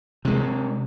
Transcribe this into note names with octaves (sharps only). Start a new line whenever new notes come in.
C3 G#3